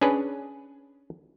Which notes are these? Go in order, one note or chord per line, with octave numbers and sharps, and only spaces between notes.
C#4 D4 G#4 B4